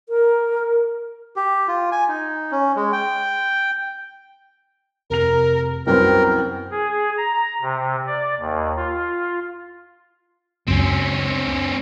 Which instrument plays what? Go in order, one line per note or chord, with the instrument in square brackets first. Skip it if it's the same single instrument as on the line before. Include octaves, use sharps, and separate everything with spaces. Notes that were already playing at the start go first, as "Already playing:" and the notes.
[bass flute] A#4
[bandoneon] G4
F4
G#5
D#4
C#4
G#3
G5
[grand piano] F1 F7 [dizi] A#4
[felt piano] C2 F#2 [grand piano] B3 C4 [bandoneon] A#4 [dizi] G5
[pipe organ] G#4
A#5
C3
D5
D#2
F4
[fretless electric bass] C#2 F#2 [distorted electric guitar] C4 C#4